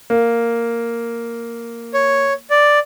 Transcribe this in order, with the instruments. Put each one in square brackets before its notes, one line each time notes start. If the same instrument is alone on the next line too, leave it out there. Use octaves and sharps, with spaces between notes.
[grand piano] A#3
[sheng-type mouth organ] C#5
D5